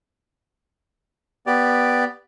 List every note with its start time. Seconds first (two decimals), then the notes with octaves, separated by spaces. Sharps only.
1.47 B3 G4 D5